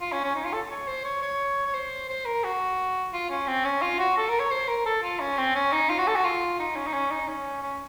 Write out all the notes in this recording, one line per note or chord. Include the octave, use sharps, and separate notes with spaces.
F4
C#4
C#4
D#4
F4
A4
C#5
C5
C#5
C#5
C#5
C5
C5
A#4
F#4
F4
C#4
C4
C#4
F4
F#4
A4
A#4
C#5
C5
A#4
A4
F4
C#4
C4
C#4
D#4
F4
F#4
A4
F#4
F4
D#4
C#4
D#4
C#4
D#4
C#4
C#4